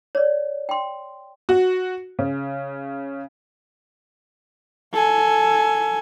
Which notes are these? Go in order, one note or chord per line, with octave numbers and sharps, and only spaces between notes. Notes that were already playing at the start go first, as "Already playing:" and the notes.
C#5 D5
G5 C6
F#4
C#3
A4 G#5